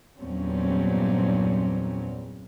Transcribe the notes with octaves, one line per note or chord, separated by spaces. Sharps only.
E2 G2 A#2 F#3 C4 C#4